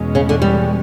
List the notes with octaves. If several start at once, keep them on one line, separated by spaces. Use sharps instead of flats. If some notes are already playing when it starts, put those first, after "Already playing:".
Already playing: E2 B2 G#3 C#4
C#3
D3
G3